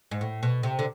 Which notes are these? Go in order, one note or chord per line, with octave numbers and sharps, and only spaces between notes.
G#2
A2
B2
C3
D3